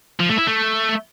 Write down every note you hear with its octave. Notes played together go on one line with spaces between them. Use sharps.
F3
A3
E4
A3